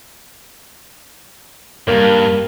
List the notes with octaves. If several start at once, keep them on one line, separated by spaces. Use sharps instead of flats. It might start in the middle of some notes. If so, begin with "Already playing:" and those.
G2 G3 A#3